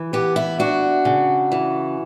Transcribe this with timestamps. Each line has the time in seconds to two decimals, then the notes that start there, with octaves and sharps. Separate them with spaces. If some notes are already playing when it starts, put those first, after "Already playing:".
Already playing: E3
0.13 B3 G4
0.36 E4
0.59 D4 F#4
1.05 C#3
1.52 E3